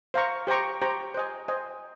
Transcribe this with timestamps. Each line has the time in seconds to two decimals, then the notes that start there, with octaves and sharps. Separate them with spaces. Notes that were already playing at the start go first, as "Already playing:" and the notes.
0.14 C5 F5 A#5 C#6
0.47 G4 C5 G5 A#5 C#6
0.82 G4 C5 G5 A#5 C#6
1.14 C5 D#5 G#5
1.48 C5 D#5 G#5